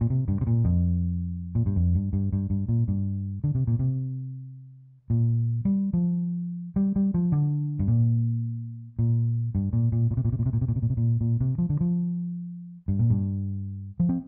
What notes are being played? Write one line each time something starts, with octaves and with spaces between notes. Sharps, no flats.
A#2
C3
G2
C3
A#2
F2
A#2
G2
F2
G2
G2
G2
G2
A#2
G2
D3
C3
A#2
C3
A#2
G3
F3
G3
G3
F3
D3
G2
A#2
A#2
G2
A#2
A#2
A#2
C3
A#2
C3
A#2
C3
A#2
C3
A#2
C3
A#2
C3
A#2
A#2
C3
F3
D3
F3
G2
A#2
G2
F3
C4